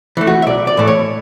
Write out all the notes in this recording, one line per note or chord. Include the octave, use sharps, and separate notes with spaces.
E3 A3
F#4
E5
B1 D5
D5
A2 E3 A3
C#5